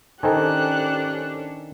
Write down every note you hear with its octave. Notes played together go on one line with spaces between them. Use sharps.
D#3 C#4 D4 G4 A4 C5 G#5 F#6